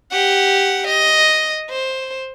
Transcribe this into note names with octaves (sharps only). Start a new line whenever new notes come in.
G4 F#5
D#5
C5